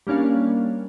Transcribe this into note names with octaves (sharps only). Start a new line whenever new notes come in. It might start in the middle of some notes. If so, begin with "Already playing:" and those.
G3 A#3 C#4 D4 F5